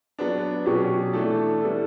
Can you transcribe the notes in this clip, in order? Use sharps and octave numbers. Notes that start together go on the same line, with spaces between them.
F#3 B3 D4
B2 F#3 C#4 G4
E3 A3 D4 A4
G3 B3 E4 A4